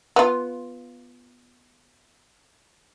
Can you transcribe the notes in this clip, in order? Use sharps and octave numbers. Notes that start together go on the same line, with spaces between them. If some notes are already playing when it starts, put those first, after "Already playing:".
B3 F4